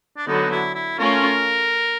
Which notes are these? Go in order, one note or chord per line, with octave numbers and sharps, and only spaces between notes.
D4
D3 F#3 B3 D#4
E4
E4
A3 C#4 F4 A#4